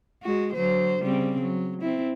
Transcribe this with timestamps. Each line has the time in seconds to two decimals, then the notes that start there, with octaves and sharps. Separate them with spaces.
0.23 G#3 F#4
0.54 D3 F#3 C5
1.00 C#3 G3 C4
1.41 F#3
1.81 C4 E4